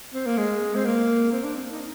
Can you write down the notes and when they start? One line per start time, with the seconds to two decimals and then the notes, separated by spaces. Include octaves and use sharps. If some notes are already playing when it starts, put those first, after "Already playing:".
0.14 C4
0.26 A#3
0.38 G#3
0.75 C4
0.86 A#3
1.32 C4
1.44 D4
1.56 C4
1.71 D#4